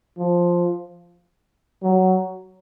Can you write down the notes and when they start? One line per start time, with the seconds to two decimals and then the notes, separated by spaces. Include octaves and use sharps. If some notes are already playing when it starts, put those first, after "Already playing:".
0.19 F3
1.83 F#3